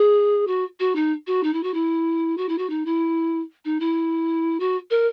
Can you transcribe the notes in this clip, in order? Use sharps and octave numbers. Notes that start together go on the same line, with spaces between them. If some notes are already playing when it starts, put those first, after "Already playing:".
Already playing: G#4
F#4
F#4
D#4
F#4
D#4
E4
F#4
E4
F#4
E4
F#4
D#4
E4
D#4
E4
F#4
A#4